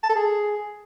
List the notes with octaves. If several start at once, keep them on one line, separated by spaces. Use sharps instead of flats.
A5
A4
G#4